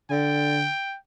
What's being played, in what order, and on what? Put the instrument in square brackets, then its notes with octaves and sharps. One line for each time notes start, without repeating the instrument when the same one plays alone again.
[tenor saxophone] D3 [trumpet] G5